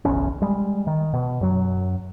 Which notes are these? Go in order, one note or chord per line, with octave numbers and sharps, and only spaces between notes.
F#1 B1 E2 C#4
G3 G#3
D#3
B2
F#2 F#3